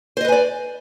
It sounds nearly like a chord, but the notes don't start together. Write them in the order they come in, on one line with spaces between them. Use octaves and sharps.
C5 D#5 B4 G#5 D5